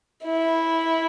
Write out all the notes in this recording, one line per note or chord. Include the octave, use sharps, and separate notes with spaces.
E4